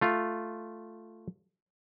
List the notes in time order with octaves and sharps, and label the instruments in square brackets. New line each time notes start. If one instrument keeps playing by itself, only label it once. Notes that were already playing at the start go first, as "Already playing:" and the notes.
[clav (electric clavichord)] A3 F4